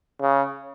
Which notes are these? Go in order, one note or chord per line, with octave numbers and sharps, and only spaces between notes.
C#3